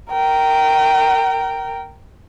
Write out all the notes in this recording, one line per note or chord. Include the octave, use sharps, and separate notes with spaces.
A#4 G5